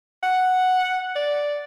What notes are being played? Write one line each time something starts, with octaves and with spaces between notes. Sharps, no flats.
F#5
D5